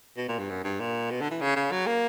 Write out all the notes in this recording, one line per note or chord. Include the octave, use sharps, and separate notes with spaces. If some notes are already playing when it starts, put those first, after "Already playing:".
B2
A#2
G2
F#2
G2
A#2
B2
D3
E3
C#3
C#3
F#3
A#3